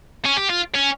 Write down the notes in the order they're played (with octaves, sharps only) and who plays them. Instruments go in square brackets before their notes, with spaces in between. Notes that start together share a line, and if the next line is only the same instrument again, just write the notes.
[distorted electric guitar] C#4
G4
F4
C#4